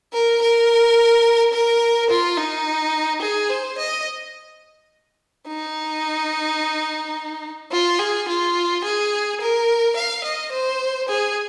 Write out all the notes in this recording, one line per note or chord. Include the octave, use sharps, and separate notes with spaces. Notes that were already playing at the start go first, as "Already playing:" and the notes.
A#4
A#4
A#4
F4
D#4
G#4
C5
D#5
D#4
F4
G#4
F4
G#4
A#4
F5
D#5
C5
G#4